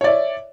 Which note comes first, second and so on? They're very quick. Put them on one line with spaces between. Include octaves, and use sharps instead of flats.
C#5 D5 E5